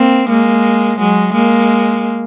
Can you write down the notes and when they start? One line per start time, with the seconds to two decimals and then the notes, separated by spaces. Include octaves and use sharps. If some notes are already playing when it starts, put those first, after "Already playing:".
Already playing: A#3 C4
0.28 G#3 A#3
0.99 F#3 G#3
1.33 G#3 A#3